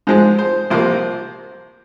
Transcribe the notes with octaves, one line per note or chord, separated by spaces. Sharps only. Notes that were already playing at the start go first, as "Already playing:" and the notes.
G#2 F3 G#3 C5
C5
C2 C3 F3 A#3 C5